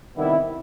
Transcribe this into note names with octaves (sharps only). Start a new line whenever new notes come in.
C3 D#3 G3 B3 E4